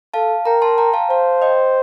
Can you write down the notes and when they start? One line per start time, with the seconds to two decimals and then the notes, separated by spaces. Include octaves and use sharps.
0.14 A4 F5 A5
0.45 A#4 G5 A#5
0.62 A5 C6
0.78 G5 A#5
0.93 F5 A5
1.10 C5 F5 A5
1.42 D#5 G5